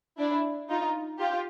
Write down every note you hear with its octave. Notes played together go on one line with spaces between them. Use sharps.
D4 E4
D#4 F4
F4 G4